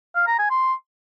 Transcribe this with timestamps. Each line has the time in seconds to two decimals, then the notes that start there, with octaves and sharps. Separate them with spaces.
0.15 F5
0.27 A#5
0.39 G#5
0.51 C6